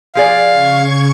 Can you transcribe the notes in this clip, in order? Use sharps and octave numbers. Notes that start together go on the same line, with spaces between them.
F3 G#4 D5 F5
C#3 C#6 G#6